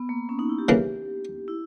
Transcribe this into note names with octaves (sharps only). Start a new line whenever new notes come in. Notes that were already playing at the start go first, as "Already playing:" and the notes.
Already playing: B3
A#3
C#4
D#4
E4
G4
C#3 E3 A#3
E4